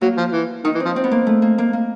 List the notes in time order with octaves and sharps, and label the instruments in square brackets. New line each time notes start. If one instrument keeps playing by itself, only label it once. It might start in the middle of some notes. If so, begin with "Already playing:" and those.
[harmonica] F#3 [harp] A#3
[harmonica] F3
E3
[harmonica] D#3 [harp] D#4
[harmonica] E3
[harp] C4
[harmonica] F3
[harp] C4
B3
A#3
A3
A#3
A#3
A#3